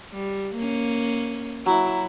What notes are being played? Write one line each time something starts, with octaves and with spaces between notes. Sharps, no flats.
G3
A#3 C#4
F#3 E4